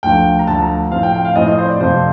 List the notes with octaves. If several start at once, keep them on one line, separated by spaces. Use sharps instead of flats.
D2 D3 F3 G5
A#5
D2 D3 F3 A5
A#5
A2 F3 C4 F5
G5
G5
F5
A2 F3 C4 D#5
D#5
C5
D5
F2 C3 F3 C5